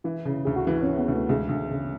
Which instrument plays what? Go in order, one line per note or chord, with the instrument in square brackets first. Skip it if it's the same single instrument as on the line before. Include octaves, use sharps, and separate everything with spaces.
[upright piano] E3 [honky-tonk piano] E4
[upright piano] C#3
[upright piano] D2 [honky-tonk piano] G#4
[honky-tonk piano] F#4
[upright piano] E3 [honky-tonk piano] E4
[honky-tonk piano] C#4
[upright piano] E3
[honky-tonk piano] B3
[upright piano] D2
[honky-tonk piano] A3
[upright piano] D2 [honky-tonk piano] G#3
[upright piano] D2
C#3